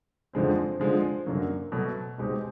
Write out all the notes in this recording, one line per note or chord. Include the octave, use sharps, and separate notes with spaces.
F2 D3 F3 G#3 C4
D3 F3 G#3
F#2 D3 F#3 A#3
B2 F#3 A3
B2 G#3 C4 D#4 G4